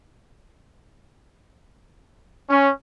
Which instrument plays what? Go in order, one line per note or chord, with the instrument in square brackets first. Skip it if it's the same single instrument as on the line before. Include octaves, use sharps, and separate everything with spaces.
[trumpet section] C#4